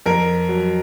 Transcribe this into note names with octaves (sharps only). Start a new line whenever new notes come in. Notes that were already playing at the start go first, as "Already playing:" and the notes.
F2 A#4
F#3